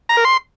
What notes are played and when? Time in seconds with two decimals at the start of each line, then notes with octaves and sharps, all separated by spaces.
0.09 A#5
0.17 A#4
0.25 C6